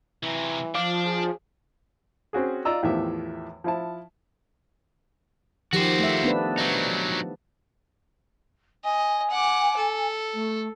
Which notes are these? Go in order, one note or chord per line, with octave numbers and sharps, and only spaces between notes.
C3 E3 F#3
F3 D4 F5 D6
G#4
C4 C#4 F#4 G#4
F4 D5 D#5 A#5 E6
E2 A2 D#3 F3 G4 E5
F3 E4 A5
D#3 F3 F#4 G4 C5
A3 E5
B3 D4 B4
F#3 D#4
D#5 G#5
F#5 D6
A4
A3